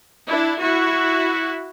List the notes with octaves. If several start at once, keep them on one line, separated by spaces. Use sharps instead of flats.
D4 E4
E4 F#4